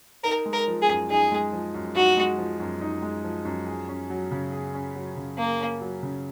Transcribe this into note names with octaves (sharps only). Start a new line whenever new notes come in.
D#4 A#4
G#3
A#4
F3
G#4
F#2
D#4 G#4
G#3
F3
F#2
D#4 F#4
G#3
F3
F#2
D#4
G#3
F3
F#2
G#4
C#4
F#3
C#3
G#4
C#4
F#3
C#3
A#3 G#4
C#4
F#3
C#3